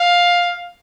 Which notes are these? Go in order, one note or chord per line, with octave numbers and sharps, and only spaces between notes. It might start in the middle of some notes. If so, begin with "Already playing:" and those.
Already playing: F5